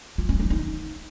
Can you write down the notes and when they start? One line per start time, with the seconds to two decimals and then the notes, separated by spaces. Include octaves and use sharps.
0.18 F4
0.29 C#4
0.40 D#4
0.50 D#4